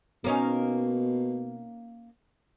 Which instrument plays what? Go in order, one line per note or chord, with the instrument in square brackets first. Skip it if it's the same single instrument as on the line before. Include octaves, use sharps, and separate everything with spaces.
[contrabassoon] B2 [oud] A#3 C#4 D#4